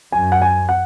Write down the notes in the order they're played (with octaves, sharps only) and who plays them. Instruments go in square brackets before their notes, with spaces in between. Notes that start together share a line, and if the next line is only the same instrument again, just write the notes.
[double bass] F#2 [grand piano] G#5
[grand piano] F#5
G#5
F#5